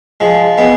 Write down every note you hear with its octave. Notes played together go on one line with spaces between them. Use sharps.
F3 G#3
G#3 B3